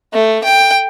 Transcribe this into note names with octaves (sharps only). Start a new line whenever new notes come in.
A3
G5